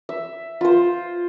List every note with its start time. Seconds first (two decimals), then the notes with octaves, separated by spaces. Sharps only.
0.09 E5
0.61 F4 C5